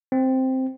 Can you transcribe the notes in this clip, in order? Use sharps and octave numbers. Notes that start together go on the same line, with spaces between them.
C4